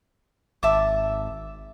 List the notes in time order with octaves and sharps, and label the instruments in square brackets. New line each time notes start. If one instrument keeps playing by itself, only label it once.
[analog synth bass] G#1 [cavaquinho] E5 A5 D6